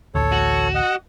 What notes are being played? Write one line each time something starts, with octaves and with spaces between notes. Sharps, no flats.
D1 A1 D2 A4 C#5
F#4
D#5 F#5